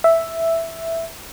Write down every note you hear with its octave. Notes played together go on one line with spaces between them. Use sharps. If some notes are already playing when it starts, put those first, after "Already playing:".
E5